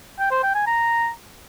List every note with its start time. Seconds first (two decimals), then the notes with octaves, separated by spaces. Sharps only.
0.19 G5
0.31 C5
0.43 G5
0.55 G#5
0.67 A#5